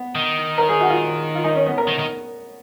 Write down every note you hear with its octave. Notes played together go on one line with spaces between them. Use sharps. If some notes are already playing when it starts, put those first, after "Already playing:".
Already playing: B3
D#3
A#4
G#4
F#4
F4
F4
D#4
C#4
B3
A#4
D#3
D#3